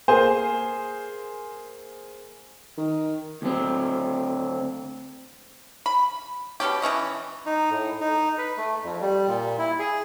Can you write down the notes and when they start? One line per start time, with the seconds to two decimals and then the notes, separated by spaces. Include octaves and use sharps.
0.08 A#3 G#4 C5 G#5
2.77 D#3
3.42 D2 C4
5.86 B5
6.60 B2 D#3 C#4 G4
6.82 E3 C#4 C#5 D#5
7.46 D#4
7.70 A2
8.01 D#4
8.38 B4
8.57 A3
8.84 F2
9.01 G3
9.27 A#2
9.59 E4
9.79 G#4